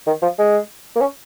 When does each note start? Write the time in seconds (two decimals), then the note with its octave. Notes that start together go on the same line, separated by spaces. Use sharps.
0.07 D#3
0.22 F3
0.38 G#3
0.96 A#3
1.01 C#4